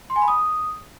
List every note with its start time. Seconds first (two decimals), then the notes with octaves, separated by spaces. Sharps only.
0.10 C6
0.16 G#5
0.22 B5
0.28 D#6